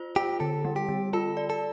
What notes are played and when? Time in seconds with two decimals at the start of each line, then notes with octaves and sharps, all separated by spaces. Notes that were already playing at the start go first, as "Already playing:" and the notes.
Already playing: F4 C5
0.16 F4 G4
0.40 D3 A4
0.65 G3
0.76 G4
0.89 D3
1.13 F4 A4
1.37 D5
1.50 A4